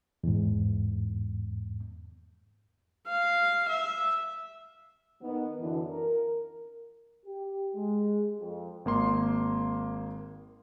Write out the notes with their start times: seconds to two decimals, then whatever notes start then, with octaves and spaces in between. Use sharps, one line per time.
0.24 E2 G#2
3.09 F5
3.69 E5
5.22 D#3 B3
5.60 F#2 D3 E3
5.89 A#4
7.26 G4
7.75 G#3
8.39 F2
8.85 G#1 A#3 C6